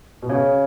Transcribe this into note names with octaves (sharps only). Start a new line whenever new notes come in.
B2
C#3 C#5